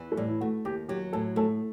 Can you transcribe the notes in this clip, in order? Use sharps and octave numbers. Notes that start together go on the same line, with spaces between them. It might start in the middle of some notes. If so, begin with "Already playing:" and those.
Already playing: E2 E3
A3
A2 G3
E4
A3 F#4
D#2 G4
F#3 G4
A2 A4
A3 A4